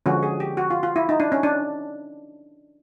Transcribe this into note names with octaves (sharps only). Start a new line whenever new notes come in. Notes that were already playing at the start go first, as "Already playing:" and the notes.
D3 F3 G#3 C#4 F#4
G#4
G4
F#4
F4
F4
E4
D#4
D4
C#4
D4